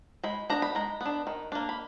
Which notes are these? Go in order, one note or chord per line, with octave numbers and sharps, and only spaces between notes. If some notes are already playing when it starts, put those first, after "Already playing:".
G#3 B5
B3 D4 A#5
B5
G#3 A#5
B3 D4
D#3
A#3 D4
B5